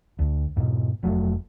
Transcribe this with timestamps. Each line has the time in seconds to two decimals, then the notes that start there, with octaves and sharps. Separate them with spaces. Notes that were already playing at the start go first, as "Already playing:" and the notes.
0.19 D2
0.57 G#2 B2
1.03 F1 F#3 A3